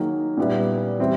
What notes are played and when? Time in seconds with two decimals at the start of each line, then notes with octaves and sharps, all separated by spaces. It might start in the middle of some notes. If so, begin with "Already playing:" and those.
Already playing: D#3 F#3 A#3 D#4 G#4
0.37 A#2 G3 B3 E4
0.99 E3 G3 C4 E4